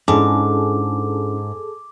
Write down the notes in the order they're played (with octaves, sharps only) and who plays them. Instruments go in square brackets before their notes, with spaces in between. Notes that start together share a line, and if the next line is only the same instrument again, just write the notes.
[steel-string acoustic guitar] G#2 [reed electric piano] C#4 D4 E4 [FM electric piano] G#4 A4 [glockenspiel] D6